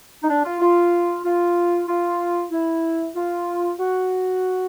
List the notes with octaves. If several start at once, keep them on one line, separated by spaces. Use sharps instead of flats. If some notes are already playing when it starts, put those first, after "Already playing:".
D#4
D4
F4
F4
F4
F4
E4
F4
F#4